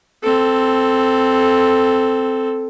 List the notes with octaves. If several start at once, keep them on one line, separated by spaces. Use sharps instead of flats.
C4 A4